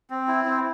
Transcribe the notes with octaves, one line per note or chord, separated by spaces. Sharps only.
C4
E4
C4